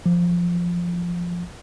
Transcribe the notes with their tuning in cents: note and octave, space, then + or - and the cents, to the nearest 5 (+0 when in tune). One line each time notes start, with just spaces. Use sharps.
F3 +0